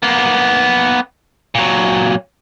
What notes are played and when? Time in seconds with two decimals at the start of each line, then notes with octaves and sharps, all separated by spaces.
0.03 A#3 B3
1.55 A#2 F#3